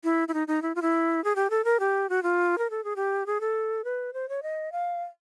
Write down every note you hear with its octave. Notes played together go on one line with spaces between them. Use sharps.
E4
E4
D#4
D#4
E4
F4
E4
G#4
G4
A4
A#4
G4
F#4
F4
A#4
A4
G#4
G4
G#4
A4
B4
C5
C#5
D#5
F5